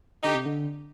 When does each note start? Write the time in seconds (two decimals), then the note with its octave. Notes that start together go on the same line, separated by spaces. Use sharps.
0.23 D3 D#4 G4
0.34 C3
0.46 D3